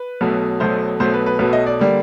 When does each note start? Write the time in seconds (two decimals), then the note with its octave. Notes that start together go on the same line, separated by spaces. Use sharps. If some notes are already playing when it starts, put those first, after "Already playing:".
Already playing: B4
0.21 B1 B2 F#3 A3
0.60 B1 B2 F#3 A3 C5
1.00 B1 B2 F#3 A3 C5
1.14 B4
1.26 B4
1.39 B1 B2 F#3 A3 B4
1.53 D#5
1.66 D5
1.80 D3 G3 A#3